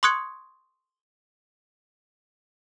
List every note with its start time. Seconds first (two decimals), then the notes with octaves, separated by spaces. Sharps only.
0.03 C6 C#6 D#6 F#6 G#6 C#7